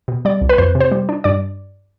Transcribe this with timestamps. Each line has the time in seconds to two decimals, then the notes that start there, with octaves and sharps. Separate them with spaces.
0.08 B2
0.25 G3 D5
0.41 C2
0.49 B4
0.58 F2 C5
0.75 C3
0.80 C5
0.91 G3
1.09 D4
1.24 G2 D5